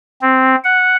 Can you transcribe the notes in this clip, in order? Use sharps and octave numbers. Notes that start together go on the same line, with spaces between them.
C4
F#5